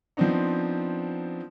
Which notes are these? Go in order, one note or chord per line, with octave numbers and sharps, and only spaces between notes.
F3 B3 C4 D4 D#4